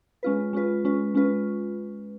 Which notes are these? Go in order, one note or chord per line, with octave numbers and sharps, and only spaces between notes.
G#3 C#4 F4 B4
G#3 C#4 F4 B4
G#3 C#4 F4 B4
G#3 C#4 F4 B4